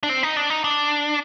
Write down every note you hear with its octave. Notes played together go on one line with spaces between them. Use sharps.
D4
C4
D#4
D4
D#4
D4